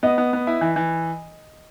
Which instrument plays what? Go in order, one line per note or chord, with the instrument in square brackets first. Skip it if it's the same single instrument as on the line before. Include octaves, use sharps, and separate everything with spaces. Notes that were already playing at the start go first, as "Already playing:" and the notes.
[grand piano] B3 [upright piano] D#5
[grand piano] B3
B3
E4
E3
E3